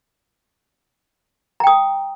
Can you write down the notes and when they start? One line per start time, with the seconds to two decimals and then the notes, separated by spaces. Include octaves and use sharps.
1.60 A#5
1.64 G5
1.67 D#6